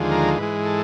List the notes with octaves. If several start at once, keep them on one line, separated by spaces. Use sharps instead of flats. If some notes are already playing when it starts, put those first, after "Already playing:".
Already playing: D#2 D3 F3 G#3
A#4
G#2 E3 G#3 B4
A4